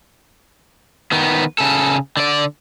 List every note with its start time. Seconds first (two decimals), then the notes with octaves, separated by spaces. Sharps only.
1.12 D#3 B3
1.59 C#3 A4
2.17 D3 D5